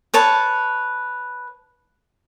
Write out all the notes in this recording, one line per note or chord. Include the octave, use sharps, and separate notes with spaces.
B4 C#5 A5